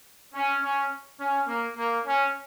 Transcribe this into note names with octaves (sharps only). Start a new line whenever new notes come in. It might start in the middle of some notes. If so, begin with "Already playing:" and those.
C#4
C#4
C#4
A#3
A#3
C#4